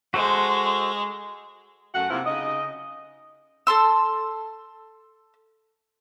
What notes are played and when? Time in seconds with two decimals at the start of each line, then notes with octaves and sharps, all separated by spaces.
0.14 G#3 F#4 A4 C5
1.94 F#2 A3 F#4 F#5
2.10 C3 A#3 E4 F4 C5
2.26 C#3 D#4 D#5
3.67 A4 A5 C6 E6